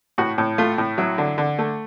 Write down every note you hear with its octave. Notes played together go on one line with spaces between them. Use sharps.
A2 F#4
A2
A3 F4
A2
F#3 E4
D3
D3
A3